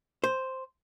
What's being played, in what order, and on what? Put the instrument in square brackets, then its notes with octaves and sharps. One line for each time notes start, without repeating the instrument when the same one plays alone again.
[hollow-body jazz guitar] C5